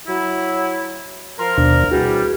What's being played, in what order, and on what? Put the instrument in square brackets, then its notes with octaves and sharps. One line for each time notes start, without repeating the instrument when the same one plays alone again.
[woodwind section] F#3 E4
[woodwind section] F3 A#4 [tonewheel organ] C6
[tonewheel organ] D#2 B2 D4
[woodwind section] C3 E3 G3 [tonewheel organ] F#4 G#4